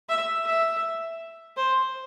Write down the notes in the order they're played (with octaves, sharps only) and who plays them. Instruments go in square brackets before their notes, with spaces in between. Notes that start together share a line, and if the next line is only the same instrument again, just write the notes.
[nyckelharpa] E5
E5
C5